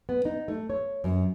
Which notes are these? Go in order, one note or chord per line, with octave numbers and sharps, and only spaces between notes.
B3
D#4
A3
C#5
F#2